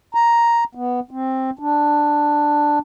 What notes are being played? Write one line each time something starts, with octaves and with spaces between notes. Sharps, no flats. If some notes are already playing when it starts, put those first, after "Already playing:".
A#5
B3
C4
D4